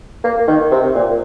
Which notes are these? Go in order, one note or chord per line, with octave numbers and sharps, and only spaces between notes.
A#3
D#3
C3
A#2